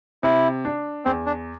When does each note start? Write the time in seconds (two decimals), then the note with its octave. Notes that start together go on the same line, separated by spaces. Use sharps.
0.23 C3 E4
0.65 D4
1.05 E2 C4
1.26 D4